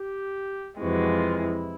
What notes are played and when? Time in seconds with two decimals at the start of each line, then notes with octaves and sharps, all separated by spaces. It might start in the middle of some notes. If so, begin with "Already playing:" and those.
Already playing: G4
0.80 F2 C3 E3 G#3 F#4
1.10 F4
1.40 E4